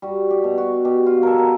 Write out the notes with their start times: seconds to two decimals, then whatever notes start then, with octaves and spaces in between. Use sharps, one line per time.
0.02 G3 F#4
0.30 G4
0.44 B2
0.58 F#4
0.85 B2 G4
1.06 F4
1.23 B3 A4 A#4
1.38 A#4